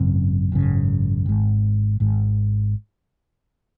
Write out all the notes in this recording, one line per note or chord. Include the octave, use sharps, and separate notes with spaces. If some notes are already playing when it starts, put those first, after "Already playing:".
Already playing: G#1 F#2 C#3 C4
G#1 F#2 C#3
G#1 G#2
G#1 G#2